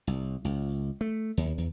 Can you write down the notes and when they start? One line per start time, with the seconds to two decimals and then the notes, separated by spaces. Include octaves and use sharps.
0.07 C2
0.45 C#2
1.01 A3
1.37 D#2
1.58 E2